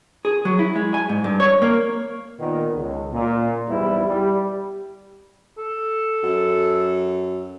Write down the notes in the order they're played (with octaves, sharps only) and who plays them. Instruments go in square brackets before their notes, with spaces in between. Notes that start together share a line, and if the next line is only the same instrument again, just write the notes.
[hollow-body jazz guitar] G#4
F#3
E4
G#3
G#5
G#2
G2
C#5
A#3
[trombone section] A#2 D#3 B3
C#2
A#2
B1 E2 G#2 G3 B3 E4
G3
[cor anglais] A4
[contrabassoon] F#2